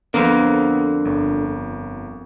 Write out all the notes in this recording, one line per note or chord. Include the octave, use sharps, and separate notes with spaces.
F2 D3 A#3 B3
G1